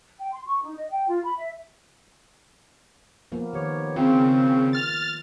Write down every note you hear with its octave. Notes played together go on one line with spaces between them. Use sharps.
G5
C6
C#6
D#4
D#5
G5
F4
B5
E5
F3 A#3 B3
D#3 B3 G4 C#5
C#3 C4 F4
F6 A6